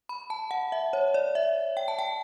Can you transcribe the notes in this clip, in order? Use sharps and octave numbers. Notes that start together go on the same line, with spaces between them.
B5
A5
F#5
E5
C#5
D5
E5
G5
A5
G5